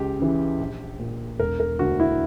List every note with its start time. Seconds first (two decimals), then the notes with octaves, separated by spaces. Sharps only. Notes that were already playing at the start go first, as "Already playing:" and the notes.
Already playing: C#2 G4
0.19 C#3 E3
0.59 A#1
0.99 A#2
1.39 E1 A#4
1.60 A#4
1.79 D2 D3 F#4
2.00 E4